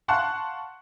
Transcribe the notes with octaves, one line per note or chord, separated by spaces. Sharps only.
F5 F#5 A5 C6 C#6 F#6